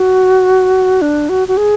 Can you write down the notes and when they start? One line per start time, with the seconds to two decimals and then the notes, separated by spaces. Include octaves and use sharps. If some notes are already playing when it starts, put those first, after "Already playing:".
Already playing: F#4
1.02 D4
1.29 F#4
1.48 F#4
1.57 G#4